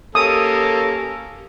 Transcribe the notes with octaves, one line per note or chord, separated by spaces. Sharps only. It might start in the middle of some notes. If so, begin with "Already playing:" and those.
A#3 C#4 G4 A4 D#6